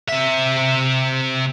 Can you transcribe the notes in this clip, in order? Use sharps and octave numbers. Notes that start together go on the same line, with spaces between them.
C3 E5